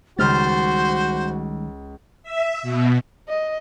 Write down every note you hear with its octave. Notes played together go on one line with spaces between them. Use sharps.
C#2 D#3 G3 G#3 F#4 C5 F6 A6
E5
B2
D#5